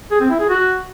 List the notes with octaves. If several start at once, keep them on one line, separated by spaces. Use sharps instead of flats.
G#4
C4
E4
G#4
F#4